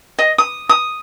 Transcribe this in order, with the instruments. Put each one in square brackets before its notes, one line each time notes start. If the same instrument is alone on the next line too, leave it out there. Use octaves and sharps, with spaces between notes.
[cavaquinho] D#5
D#6
D#6